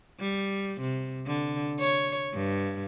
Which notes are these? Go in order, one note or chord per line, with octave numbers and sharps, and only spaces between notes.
G3
C3
D3
C#5
G2